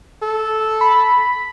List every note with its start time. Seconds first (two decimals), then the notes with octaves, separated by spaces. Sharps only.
0.22 A4
0.81 B5